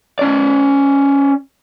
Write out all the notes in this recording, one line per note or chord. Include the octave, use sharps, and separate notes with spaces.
C#4 D5